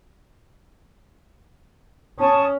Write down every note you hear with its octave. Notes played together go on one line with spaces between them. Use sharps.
C#4 A5 C#6 D#6